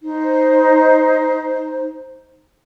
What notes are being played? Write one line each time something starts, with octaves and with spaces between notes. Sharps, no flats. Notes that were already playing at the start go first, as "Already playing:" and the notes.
D#4 C5